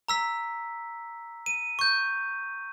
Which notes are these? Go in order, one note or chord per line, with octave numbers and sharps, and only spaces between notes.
A#5 E6 B6
D#7
C#6 G6